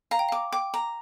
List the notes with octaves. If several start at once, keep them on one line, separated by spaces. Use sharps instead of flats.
F5 A#5
G5
F5 D6
G5 D6
A#5